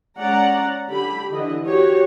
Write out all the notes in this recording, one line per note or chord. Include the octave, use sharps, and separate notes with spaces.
G#3 C#4 D5 F#5 A#5
D3 G4 B5
D3 E3 D#5
F#4 G4 C#5